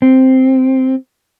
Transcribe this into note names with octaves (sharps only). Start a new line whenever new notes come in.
C4